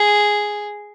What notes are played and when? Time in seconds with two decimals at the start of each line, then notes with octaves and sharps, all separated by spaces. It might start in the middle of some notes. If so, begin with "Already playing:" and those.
Already playing: G#4